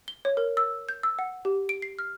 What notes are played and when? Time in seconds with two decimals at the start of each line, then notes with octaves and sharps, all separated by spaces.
0.08 G7
0.25 C#5
0.37 A#4
0.57 E6
0.89 G6
1.03 E6
1.19 F#5
1.45 G4
1.69 D7
1.82 C7
1.99 F6